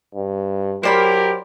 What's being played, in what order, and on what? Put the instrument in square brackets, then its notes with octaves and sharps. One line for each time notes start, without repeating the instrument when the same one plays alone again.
[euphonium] G2
[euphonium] F#3 [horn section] E4 G4 A#4 [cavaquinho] C5 D5 B5